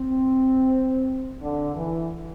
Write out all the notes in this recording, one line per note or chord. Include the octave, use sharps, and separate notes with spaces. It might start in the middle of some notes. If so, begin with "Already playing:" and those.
Already playing: C4
D3
E3